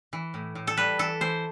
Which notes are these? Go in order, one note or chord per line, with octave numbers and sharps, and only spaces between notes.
E3
A2
A2
A4
G3 B4
E3 A4
E3 C5